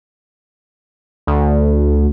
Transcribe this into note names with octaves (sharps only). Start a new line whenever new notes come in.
D2